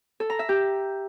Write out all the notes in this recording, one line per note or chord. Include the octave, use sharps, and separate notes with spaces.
A4
A#5
E5
G4